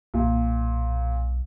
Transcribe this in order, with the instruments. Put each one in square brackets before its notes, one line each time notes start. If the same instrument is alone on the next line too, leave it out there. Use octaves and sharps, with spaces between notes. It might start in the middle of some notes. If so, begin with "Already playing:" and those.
[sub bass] B1 [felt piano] A#2